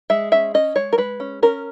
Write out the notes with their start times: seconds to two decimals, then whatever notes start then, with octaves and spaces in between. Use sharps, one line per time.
0.10 G#3 E5
0.32 C#4 E5
0.54 C#4 D#5
0.76 G#3 C#5
0.93 A#4
0.98 G#3 B4
1.20 C#4
1.42 C#4 A#4